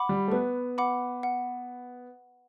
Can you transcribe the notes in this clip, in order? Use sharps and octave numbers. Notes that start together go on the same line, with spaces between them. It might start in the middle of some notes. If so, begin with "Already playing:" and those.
Already playing: F#5 B5 D6
G3
A3
B3 B4
F#5 B5 D6
F#5